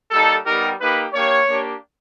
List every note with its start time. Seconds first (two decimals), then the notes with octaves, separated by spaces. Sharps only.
0.11 G3 A#3 D#4 A4
0.45 G3 B3 D#4 G4 A#4
0.79 A#3 D#4 G4 B4
1.12 A#3 D4 G4 C#5
1.47 A#3 D4 G4